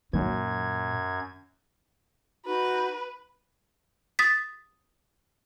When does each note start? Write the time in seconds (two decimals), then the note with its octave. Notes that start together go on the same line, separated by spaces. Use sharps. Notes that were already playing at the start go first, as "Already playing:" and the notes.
0.13 F#2 A#2 D#3 F#3 G#6
2.46 D#4 F#4 B4
4.19 D#6 A6 B6